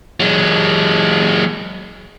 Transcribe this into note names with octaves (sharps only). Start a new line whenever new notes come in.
F#3 G#3